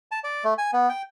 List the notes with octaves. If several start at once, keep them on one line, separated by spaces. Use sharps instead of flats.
A5
D5
A3
G#5
B3
G5